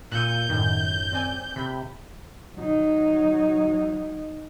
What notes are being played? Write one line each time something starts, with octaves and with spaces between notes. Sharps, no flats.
A#2 E6 G6 C#7 D#7
F#2 A2 D#3
C4 D5 G#5
C3 B5
F#3 D#4